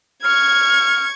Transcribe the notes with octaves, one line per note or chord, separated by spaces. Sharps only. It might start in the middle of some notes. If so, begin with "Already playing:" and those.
C#6 F6 G#6